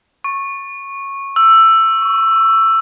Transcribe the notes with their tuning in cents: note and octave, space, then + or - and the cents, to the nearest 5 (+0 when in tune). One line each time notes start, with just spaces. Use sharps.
C#6 -10
E6 +10
C#6 +25